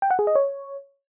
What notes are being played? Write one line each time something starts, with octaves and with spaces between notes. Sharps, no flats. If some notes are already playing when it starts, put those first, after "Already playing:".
G5
F#5
G#4
D#5
C#5